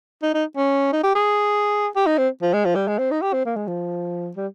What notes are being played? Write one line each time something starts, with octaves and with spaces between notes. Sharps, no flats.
D#4
D#4
C#4
D#4
G4
G#4
G4
D#4
C4
F3
G#3
F3
G3
G#3
C4
D#4
G4
C4
A#3
G#3
F3
G3